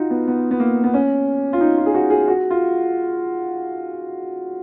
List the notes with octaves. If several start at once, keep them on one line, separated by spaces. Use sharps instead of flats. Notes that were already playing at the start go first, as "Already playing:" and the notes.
Already playing: D#4 F4 F#4
B3
B3
B3
A#3
B3
C#4
F4
D#4
F4
G#4
F#4
G#4
F#4
F4